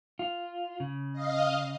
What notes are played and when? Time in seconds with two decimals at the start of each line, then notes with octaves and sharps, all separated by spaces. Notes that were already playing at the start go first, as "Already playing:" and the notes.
0.19 F4
0.80 C#3
1.13 D#5 F5